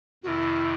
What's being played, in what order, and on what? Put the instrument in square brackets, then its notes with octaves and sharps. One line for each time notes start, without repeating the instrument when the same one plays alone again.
[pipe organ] F2 C3 D#3 [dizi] E4 F#4